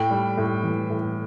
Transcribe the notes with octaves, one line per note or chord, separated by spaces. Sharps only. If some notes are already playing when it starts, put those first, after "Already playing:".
Already playing: A2 G5
G3
A2
E3
A2